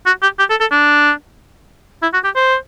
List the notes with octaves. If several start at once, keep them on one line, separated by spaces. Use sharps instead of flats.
F#4
G4
G4
A4
A4
D4
E4
F#4
G4
C5